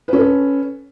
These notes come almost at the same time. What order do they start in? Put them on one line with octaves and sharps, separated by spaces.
B4 C#4 A4